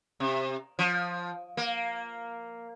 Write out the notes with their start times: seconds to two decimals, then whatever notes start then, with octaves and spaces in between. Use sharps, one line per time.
0.20 C3
0.79 F3
1.57 A#3